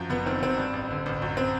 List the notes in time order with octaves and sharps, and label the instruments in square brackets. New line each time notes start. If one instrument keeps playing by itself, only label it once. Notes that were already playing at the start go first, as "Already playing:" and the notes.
Already playing: [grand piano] F#2 F3
F#1 B3
D#3 C4
F#1 C4
G2
A1
D3
A1
F#2
C4